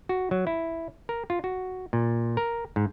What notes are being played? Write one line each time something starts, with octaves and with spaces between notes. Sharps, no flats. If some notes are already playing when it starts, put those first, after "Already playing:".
F#4
F#3
E4
A#4
F4
F#4
A#2
A#4
G#2